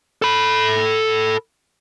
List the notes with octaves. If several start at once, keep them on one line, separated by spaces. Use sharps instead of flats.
A4 B5